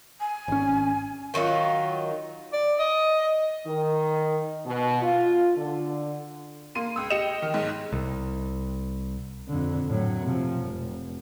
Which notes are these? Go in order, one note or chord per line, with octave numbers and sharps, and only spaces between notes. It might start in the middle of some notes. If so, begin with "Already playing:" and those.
G#5
G#1 C#4
D#3 F#3 D#4 F4
D5
D#5
D#3
B2
F4
D3
A#3 C6 D#7
C#2 E6
G4 D#5 C#7 E7
D#3
B1 G#2
C2
F2 D3
A2 F#3
C3 F3
F1